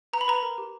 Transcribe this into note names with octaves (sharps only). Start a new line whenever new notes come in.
B4 A#5
B5
B4 A#5
A#4
G4